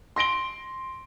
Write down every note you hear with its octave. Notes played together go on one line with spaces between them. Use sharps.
C6 A#6 D7 G7